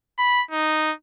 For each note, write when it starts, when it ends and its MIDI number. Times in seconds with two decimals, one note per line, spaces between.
0.19 0.43 83
0.51 0.93 63